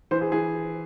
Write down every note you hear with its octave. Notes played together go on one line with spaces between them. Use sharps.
E3 C5
G#4
E3 G#4